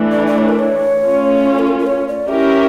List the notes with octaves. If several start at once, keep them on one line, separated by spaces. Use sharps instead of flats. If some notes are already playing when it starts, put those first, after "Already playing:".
Already playing: E3 A3 D4
D5
D5
C#5
A#4
C#5
A3 C#4 F4
A4
A#4
A#4
C#5
D5
C#4 E4 G4 A#4 E5